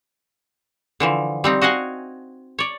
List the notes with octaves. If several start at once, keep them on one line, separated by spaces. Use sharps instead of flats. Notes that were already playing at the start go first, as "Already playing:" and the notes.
D3 E3 F3
G3 C4 D#4
F#4 D#5 F5 F#5 G#5
C#5 D5